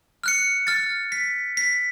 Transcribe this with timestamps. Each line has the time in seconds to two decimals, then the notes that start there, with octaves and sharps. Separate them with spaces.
0.24 F6 F#6 C#7
0.67 F6 A6
1.12 B6
1.57 B6